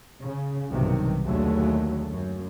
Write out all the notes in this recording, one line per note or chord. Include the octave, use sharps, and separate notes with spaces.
C#3
B1 G2 C3 D#3
D#2 D3 F#3 G#3 A3
F#2